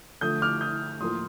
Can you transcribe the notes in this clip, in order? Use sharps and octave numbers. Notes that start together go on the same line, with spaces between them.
D3 F3 A3 D#6 G6
D6 F6
D#6 G6
A2 F3 A#3 C6 D#6